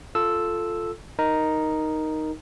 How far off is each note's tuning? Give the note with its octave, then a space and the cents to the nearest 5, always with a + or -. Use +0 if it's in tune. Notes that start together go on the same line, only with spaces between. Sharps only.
F4 +0 A4 +0 E6 +0
D#4 +0 A#4 +0